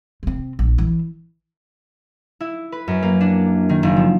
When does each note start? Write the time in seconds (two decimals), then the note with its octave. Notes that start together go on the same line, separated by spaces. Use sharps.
0.23 C3 C4
0.59 A#1
0.78 E3
2.41 E4
2.72 B4
2.88 F#2
3.03 A#3
3.21 D4
3.69 D#3
3.83 F#1
3.97 F3